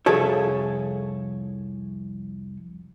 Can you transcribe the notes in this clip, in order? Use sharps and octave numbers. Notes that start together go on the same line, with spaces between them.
C2 F2 G#4 A4 C#5